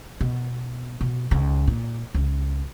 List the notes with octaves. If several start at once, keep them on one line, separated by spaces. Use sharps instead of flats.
B2
B2
C#2 D#3
A#2
C#2